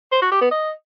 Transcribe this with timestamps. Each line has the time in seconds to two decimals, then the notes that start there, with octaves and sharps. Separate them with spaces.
0.12 C5
0.22 F#4
0.32 G4
0.41 B3
0.51 D#5